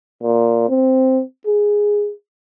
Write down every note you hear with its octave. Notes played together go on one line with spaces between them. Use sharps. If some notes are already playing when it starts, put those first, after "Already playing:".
A#2
C4
G#4